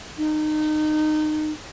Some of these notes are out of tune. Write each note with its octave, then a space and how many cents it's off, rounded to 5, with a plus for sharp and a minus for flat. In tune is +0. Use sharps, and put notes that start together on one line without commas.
D#4 -25